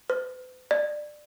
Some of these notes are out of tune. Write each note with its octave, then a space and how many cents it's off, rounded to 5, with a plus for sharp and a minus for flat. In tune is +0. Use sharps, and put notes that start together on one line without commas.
B4 +45
D5 +20